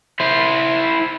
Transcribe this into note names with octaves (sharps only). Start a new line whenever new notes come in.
E4 C5